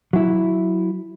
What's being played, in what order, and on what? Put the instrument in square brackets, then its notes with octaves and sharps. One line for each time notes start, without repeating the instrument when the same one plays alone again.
[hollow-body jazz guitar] F#3 E4